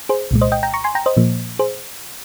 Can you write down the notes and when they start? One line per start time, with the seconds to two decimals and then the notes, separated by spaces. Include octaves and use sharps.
0.09 G#4 C5
0.31 C2 A#2 G#3
0.41 C5 D#5
0.52 D#5 G5
0.63 G5 A#5
0.74 A#5 C#6
0.84 G#5 C6
0.95 G5 A#5
1.06 C5 D#5
1.17 A#2 F3 A#3
1.59 G#4 C5